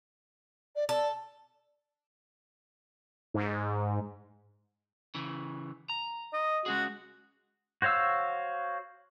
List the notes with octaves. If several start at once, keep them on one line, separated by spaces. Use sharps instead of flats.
D5
A4 D5
G#2
C#3 E3
A#5
D#5
G#3 C#4 F#4 G#4
F#4 C5 C#5 F5 E6